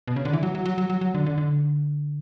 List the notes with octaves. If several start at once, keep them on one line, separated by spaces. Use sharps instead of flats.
B2
C#3
D3
E3
F#3
F#3
F#3
F#3
F#3
F#3
D3
D3
D3